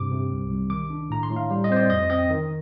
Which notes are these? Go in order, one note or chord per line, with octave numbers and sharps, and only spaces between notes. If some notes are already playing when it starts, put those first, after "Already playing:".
Already playing: G2 C3 D6
C3
C2
C2
D#3 D6
D4
A2 A#5
C6
A2
F5
G3
D#5
C4 C5
D5
F2 D#5
C4 D#5
D#3